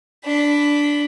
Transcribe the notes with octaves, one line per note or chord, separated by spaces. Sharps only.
D4 B5